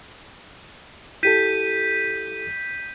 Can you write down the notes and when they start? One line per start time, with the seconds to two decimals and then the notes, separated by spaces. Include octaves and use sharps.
1.23 E4 G4 A4 G6 B6 D#7